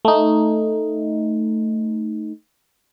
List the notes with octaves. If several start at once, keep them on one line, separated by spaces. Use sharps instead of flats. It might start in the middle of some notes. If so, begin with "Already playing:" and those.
A3 D#4